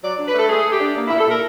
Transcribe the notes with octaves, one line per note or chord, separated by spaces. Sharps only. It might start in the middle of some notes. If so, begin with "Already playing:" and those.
F#3 D5
D4
B4
A3 A4
A3 G#4
A3
G4
D4
A#3
A#2 E4
A4
A#2 A#4